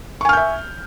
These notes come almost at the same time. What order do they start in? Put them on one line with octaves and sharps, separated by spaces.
C#6 G#5 F6 G6 E5